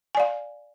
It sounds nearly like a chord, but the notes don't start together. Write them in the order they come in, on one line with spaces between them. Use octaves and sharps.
G#5 D5 F5